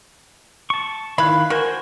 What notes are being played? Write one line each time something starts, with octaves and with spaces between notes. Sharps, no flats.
A5 C#6
D#3 E4 F5 B5 F#6
F#4 A#4 C5 G#5